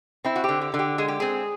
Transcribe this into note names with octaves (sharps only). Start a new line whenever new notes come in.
C4 E4
F#4
D3 G4
G4
D3
G4
G#3 G#4
G4
C4 G#4